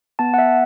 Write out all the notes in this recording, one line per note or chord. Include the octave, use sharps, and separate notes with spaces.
B3 A5
F#5
E5